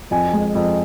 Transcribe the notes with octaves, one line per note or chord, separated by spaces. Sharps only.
F2 G#5
G#3
F2